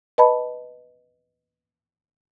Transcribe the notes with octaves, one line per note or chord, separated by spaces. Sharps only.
B4 D#5 A5 B5